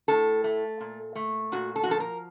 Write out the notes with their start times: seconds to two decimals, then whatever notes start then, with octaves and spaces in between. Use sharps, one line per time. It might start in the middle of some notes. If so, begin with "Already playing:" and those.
0.08 A2 A4
0.44 A3
0.80 A#2
1.15 A3
1.52 A#2 F#4
1.76 A4
1.83 F#4
1.88 F3 A4
2.00 A#4